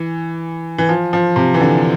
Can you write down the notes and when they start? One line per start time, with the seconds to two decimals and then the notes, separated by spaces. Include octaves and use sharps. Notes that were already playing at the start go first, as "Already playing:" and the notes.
Already playing: E3
0.78 E3
0.89 F3
1.13 F3
1.36 C3
1.54 E3
1.60 D3